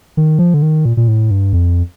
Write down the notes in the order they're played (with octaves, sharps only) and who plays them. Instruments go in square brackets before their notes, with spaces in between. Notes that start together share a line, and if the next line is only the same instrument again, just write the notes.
[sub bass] D#3
F3
D3
D#3
A#2
A#2
A2
G2
F2